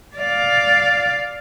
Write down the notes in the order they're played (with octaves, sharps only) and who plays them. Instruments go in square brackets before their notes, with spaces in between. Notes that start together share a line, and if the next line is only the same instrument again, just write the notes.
[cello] D5 F5